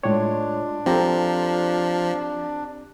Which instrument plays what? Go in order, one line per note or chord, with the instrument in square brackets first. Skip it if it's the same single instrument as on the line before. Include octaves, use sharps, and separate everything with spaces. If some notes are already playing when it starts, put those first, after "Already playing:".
[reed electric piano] A2 C#5 [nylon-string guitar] G#3 F4 G5 [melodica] D4
[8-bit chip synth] F3 [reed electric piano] C4 G4 A#5 [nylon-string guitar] F4 A4